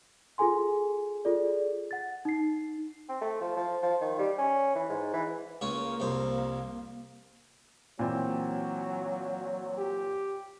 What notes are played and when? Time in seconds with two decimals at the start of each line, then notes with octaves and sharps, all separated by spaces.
0.38 F4 G#4 A4 G#5 C6
1.25 F4 G#4 A4 D5
1.91 F#5 A6
2.25 D#4 C7
3.09 C4
3.21 A3
3.41 F3
3.56 F3
3.83 F3
4.01 D#3
4.19 G3
4.38 C#4
4.75 E3
4.89 G#2
5.14 E3
5.61 C#2 C#3 A#3 C#5
6.00 C2 F2 C5
7.99 A#2 E3 F#3 C4
9.78 G4